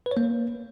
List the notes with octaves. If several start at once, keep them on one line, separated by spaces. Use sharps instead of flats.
B4
C#5
A#3